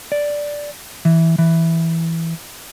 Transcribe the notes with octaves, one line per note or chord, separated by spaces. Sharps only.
D5
E3
E3